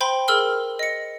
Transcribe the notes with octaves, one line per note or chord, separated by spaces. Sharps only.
C5 G5 B5 C6
G#4 A#4 E6 F6 G7
D#5 C#7